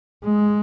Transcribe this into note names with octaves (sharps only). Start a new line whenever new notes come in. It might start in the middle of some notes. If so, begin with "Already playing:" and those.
G#3